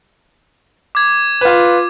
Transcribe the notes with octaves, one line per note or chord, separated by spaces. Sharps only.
D6 G#6
F4 B4